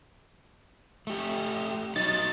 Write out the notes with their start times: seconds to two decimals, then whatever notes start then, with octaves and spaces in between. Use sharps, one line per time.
1.07 A3 G4
1.96 F#3 D#4 A6